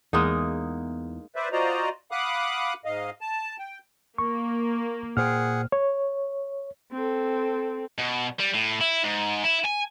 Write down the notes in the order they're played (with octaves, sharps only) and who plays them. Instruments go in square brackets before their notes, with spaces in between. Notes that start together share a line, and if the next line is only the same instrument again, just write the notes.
[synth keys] E2 [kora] G#3 A#3 D#4
[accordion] B4 C5 D5 E5
F4 F#4 C5 D5 D#5 A#5
F5 F#5 B5 D6 D#6 F#6
G#2 D#5 F5
A5
G5
[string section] A#3 [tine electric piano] C#6
[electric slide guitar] A#2 C5 G5 [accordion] G#4 F#5 [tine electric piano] F6
[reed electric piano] C#5
[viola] C4 A4
[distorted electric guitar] B2
G3
A2
E4
G#2
E4
G#5